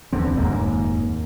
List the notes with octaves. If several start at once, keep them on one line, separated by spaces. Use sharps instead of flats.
D1 E2 D3 C4
F1 D#2 G#2 A#3